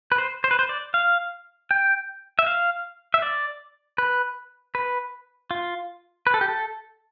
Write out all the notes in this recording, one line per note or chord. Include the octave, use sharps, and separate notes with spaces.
B4
C5
C5
B4
C5
D5
F5
G5
E5
F5
E5
D5
B4
B4
F4
B4
A4
G4
A4